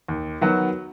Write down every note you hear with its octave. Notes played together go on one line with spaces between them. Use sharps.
D#2
D#3 F#3 B3 F#4